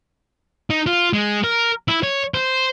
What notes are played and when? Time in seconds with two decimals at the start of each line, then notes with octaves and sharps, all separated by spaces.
0.70 D#4
0.87 F4
1.13 G#3
1.44 A#4
1.88 E4
2.03 C#5
2.34 C5